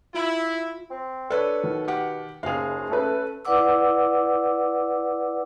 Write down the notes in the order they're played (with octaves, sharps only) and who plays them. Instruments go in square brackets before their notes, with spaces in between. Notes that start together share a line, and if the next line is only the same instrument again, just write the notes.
[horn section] E4 [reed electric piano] F4
[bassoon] C4
[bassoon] D4 [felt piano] A4 B4 C#5
[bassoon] B2 [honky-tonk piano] D#3
[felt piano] G4 F#5
[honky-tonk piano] F#1 F7 [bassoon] D#2 [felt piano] G#4 F5
[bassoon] A3 [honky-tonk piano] C#4 A4 B4
[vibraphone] E4 B4 D5 F#5 D6 E6